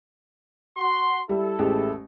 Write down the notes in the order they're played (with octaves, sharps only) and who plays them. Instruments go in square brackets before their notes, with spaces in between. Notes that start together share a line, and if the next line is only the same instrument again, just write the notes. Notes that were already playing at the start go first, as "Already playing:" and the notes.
[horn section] F#4 C6
[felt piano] G3 [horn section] E4 A4
[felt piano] A1 G#3 G4